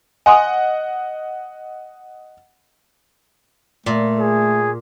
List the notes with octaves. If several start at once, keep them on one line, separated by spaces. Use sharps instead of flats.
D#5 F#5 G#5 C6 D#6
A#2 A3
G#4